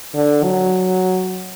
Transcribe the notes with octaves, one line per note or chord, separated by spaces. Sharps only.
D3
F#3